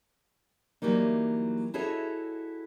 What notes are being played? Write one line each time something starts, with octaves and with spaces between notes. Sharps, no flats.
E3 F#3 G3 A#3 D#4
E4 F#4 G#4 A4 C#5 D#5